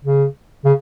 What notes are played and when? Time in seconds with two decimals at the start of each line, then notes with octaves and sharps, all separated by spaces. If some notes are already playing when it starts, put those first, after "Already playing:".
0.05 C#3
0.65 C#3